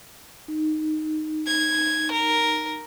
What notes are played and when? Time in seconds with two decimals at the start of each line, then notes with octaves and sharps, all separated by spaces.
0.48 D#4
1.47 G#6
2.12 A#4